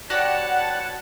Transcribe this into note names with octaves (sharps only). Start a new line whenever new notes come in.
F#4 G4 B4 C#5 D5 F#5 A5 F#6